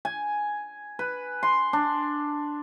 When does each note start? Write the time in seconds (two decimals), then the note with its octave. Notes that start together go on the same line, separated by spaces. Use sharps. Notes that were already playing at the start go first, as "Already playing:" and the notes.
0.05 G#5
0.99 B4
1.43 C6
1.73 D4